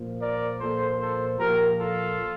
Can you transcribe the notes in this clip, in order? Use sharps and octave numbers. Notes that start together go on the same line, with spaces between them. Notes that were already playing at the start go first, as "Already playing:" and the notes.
Already playing: A#2 F3
A#4 D5
A#2 F3 A4 C5
A4 C5
A#2 F3 G4 A#4
F4 A4